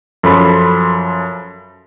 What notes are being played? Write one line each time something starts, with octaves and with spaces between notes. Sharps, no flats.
F#2 F3 A4 B5 C6